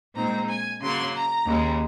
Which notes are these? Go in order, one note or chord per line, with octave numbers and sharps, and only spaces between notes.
A#2 G#3 C4 D#4 A#5
G#5
C#3 F#3 A#3 C6
A#5
D#2 C#3 G#3